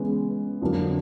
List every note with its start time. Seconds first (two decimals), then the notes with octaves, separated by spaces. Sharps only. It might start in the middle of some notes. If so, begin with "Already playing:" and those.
Already playing: C#3 E3 G#3 B3
0.62 F2 D3 F#3 A#3